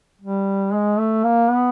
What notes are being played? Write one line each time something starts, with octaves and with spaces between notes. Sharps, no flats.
G3
G#3
A3
A#3
B3